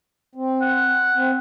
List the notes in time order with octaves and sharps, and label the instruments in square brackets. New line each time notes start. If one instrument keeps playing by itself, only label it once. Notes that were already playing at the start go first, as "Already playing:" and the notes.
[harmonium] C4
[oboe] F#5
[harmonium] C4